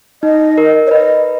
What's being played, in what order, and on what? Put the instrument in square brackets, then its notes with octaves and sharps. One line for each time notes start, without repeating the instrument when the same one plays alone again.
[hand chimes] D#4 [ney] D#5
[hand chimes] A#4
[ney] C#5
[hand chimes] B4 [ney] D#5